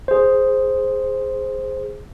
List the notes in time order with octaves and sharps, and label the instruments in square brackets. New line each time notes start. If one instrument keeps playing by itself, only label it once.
[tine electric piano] G#4 C5